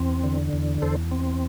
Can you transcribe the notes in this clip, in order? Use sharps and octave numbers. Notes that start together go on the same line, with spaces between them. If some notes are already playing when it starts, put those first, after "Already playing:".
Already playing: E2 C4
D3
E2
E2 A4 C5
C4